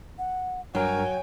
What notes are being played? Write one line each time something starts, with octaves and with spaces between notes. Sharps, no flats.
F#5
G2 F#3 A#4 C#5 G5 G#5